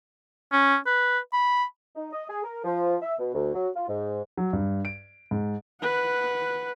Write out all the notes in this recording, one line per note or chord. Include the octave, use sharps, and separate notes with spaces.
C#4
B4
B5
D#4
D#5
G#4
A#4
F3
E5
B2
D2
F#3
F4
G#2
F#3
G2
D7
G#2
B4 F#5